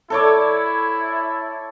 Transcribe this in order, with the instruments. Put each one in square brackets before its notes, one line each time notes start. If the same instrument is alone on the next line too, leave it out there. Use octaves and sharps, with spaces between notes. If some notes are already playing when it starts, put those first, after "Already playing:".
[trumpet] E4 [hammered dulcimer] A4 C#5 D5